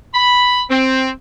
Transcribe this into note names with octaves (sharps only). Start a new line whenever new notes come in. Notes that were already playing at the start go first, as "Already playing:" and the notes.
B5
C4